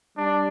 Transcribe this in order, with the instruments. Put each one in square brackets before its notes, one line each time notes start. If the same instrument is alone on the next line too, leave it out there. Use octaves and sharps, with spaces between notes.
[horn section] G3 D4